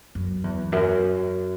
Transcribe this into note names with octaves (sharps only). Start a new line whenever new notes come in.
F#2
E2
F#2